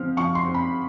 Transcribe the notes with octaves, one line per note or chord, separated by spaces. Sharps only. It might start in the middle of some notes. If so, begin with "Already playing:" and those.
Already playing: F3 C4 F6
F3 C#6
C6
C4
B5